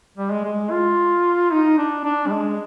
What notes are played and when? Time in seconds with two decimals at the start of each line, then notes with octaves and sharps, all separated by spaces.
0.18 G3
0.31 G#3
0.45 G#3
0.71 F4
1.51 D#4
1.78 D4
2.05 D4
2.27 G3
2.32 G#3